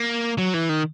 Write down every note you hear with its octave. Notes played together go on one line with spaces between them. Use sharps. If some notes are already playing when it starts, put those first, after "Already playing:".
Already playing: A#3
F#3
E3
D#3